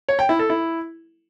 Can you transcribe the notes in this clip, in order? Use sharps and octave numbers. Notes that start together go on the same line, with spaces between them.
C#5
G5
E4
A4
E4